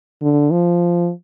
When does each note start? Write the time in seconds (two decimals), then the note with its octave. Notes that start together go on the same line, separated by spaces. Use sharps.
0.22 D3
0.51 F3